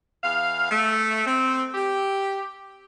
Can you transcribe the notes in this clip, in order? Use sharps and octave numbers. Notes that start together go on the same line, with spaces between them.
E2 F5
A3
C4
G4